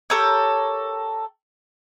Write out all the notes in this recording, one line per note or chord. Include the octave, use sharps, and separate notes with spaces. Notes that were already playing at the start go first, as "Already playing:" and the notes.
G4 A4 A#4 C#5